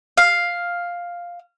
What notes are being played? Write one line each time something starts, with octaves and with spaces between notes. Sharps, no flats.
F5